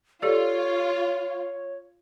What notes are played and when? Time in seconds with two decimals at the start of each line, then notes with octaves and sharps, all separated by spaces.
0.22 F4 G4 A4 C#5 D5